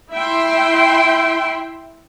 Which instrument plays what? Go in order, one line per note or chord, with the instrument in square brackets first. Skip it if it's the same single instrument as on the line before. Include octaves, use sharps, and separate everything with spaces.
[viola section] E4 E5 G5 C6